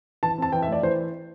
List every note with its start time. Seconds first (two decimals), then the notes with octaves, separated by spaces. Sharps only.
0.23 E3 A5
0.38 C4 A5
0.52 E3 G5
0.62 E5
0.68 A3 D5
0.83 E3 C5